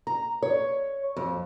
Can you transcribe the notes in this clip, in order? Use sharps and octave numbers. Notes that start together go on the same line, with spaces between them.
A#5
C#5
F2